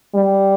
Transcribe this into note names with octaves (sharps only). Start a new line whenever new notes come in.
G3